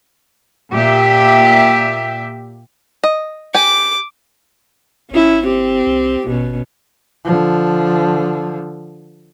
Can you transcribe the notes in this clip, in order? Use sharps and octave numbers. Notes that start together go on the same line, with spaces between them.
A#2 G4 E5
D#5
G4 G#5 D6
G#1 C#4 E4
C4 G4
C2
G#1 B2 C#4
D3 F3